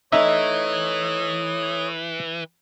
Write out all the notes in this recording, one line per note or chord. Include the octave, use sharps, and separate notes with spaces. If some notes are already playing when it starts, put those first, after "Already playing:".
E3 A3 D#4 C#5 E5 D#6